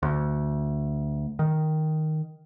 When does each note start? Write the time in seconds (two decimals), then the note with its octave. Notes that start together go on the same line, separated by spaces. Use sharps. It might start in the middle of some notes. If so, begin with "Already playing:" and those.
0.03 D2
1.39 D#3